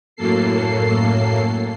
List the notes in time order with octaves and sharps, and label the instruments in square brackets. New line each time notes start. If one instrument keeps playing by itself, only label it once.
[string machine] F#2 A2 F#3 A#3 A4 C7